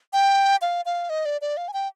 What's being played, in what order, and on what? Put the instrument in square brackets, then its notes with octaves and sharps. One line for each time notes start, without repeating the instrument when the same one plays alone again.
[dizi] G5
F5
F5
D#5
D5
D5
F5
G#5
G5